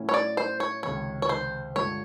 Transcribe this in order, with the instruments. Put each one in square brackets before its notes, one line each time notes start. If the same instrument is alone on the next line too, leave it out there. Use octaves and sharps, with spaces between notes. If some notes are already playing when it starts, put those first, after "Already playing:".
Already playing: [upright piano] A2 F#3 A3 C#4 E4
[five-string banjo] C#5
D5
C5
C#5
[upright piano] C#2 C3 D#3 [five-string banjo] C#5
[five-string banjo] C#5
C5
[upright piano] G2 D3 F3 G#3 [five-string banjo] C#5